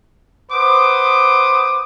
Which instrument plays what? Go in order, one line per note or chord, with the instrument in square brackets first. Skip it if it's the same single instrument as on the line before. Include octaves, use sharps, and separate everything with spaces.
[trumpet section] B4 C5 F#5 D6 D#6